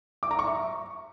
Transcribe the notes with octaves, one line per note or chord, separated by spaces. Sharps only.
D6
A#5
C#6
E5